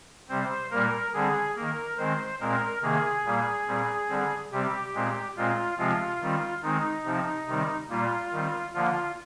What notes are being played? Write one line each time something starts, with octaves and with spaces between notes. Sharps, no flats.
C3 G3 C4 C5
A#2 G3 A#3 A#4
D3 G3 C4 G#4
D#3 A#3 A#4
D#3 G#3 C4 C5
A#2 G#3 C4 A#4
C3 D#3 A#3 G#4
A#2 G3 A#3
A#2 G3 C4
D3 G3 C4
C3 G3 C4 G4
A#2 G#3 C4
A#2 G#3 C4 F4
C3 F3 G#3 C4 F4
D#3 G3 C4
D#3 G#3 C4 D#4
C3 F3 C4
C3 D#3 G3 C4
A#2 G3 A#3 F4
D#3 G3 C4
D3 F3 A#3 F4